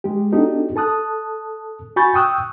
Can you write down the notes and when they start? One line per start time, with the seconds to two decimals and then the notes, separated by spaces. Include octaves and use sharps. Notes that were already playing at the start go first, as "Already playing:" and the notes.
0.04 G#3 G4
0.32 B3 D4 D#4 F#4 G4 A4
0.76 A4 A5 D#6 F#6
1.96 F#4 G#5 B5 C#6 G6 A6
2.14 G5 C#6 D#6 E6 F#6 G6